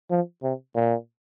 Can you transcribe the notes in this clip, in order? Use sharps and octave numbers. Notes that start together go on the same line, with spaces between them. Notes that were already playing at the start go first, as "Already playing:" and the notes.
F3
C3
A#2